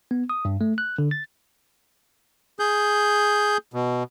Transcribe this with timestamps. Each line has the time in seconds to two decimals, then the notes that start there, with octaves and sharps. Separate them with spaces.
0.11 B3
0.30 D#6
0.45 G2
0.61 A3
0.78 F#6
0.98 D3
1.11 A6
2.59 G#4 G6
3.74 B2